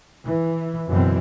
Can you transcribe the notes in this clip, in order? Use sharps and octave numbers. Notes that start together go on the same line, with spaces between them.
E3
F#1 F#2 B2 E3 C4